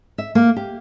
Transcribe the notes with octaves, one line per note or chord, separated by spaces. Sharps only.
E5
A#3
G4